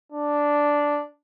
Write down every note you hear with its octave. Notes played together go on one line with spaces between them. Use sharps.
D4